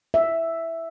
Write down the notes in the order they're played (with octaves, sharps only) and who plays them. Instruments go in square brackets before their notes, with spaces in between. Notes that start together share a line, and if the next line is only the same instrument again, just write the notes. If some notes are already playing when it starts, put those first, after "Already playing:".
[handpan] E5